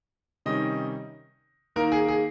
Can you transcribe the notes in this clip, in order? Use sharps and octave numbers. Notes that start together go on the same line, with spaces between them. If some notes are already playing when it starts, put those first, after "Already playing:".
C3 D#3 G3 C#4 D#5
D#3 A#3 D#4 A#4
G#4
G#4